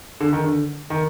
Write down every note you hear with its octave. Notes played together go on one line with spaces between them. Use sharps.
D3
D#3
D3
D#3